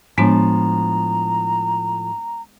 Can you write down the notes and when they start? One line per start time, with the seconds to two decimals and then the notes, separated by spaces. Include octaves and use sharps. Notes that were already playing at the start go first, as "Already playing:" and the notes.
0.18 A2 F3 G#3 B3 D4 A#5